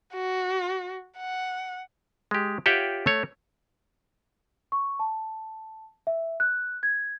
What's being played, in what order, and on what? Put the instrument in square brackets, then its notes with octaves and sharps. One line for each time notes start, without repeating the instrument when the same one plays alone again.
[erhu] F#4
F#5
[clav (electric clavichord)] G#3 G4
F4 G4 C#5 E5 F#5 G5
A3 C#5
[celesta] C#6
A5
E5
F#6
G#6